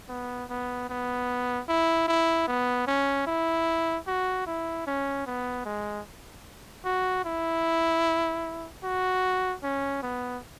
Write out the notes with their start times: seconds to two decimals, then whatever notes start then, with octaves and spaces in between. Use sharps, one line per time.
0.09 B3
0.50 B3
0.89 B3
1.69 E4
2.08 E4
2.47 B3
2.87 C#4
3.27 E4
4.07 F#4
4.47 E4
4.87 C#4
5.26 B3
5.66 G#3
6.85 F#4
7.25 E4
8.83 F#4
9.63 C#4
10.03 B3